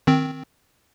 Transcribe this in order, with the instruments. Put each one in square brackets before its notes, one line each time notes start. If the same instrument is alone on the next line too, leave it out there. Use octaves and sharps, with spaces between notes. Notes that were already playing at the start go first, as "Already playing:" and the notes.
[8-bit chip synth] D#3 C4